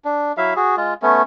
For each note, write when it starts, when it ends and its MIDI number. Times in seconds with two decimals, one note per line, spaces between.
0.05 0.32 62
0.37 0.54 54
0.37 0.54 64
0.37 0.54 76
0.37 0.54 77
0.56 0.76 66
0.56 0.76 68
0.77 0.94 56
0.77 0.94 65
1.02 1.22 57
1.02 1.22 59
1.02 1.22 61